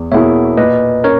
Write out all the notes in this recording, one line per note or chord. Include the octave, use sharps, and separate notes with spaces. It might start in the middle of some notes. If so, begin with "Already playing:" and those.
Already playing: E2
B2 A#3 E4 G#4 C#5 E5
A#2 B4 D#5
C#4 A#4 C#5